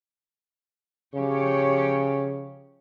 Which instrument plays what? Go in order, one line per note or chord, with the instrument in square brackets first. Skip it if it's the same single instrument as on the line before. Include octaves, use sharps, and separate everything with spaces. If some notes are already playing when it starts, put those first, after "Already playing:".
[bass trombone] C#3 [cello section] F3 G4 C#5